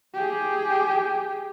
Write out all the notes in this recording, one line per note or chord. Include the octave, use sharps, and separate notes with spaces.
G4 G#4